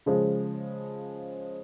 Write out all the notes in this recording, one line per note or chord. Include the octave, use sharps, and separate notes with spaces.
C#3 F3 G#3